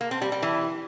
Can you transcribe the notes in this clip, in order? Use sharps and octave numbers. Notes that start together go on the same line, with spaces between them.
A#3
C4
G3
G3
E3